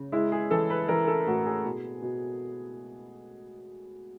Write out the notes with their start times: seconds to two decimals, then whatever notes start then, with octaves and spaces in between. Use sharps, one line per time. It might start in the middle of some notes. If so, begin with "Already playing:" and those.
Already playing: C#3
0.12 G#3 E4
0.32 G#4
0.51 E3 A4
0.70 B4
0.88 E3 A#4
1.07 A4
1.27 A2 F#4
1.46 G#4
1.65 B2
2.02 B2